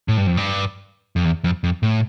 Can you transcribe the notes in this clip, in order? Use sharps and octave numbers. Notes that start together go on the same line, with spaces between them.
A2
G2
F2
G2
F2
E2
F2
F2
A2